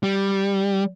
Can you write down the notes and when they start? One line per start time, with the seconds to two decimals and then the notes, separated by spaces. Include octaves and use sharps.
0.03 G3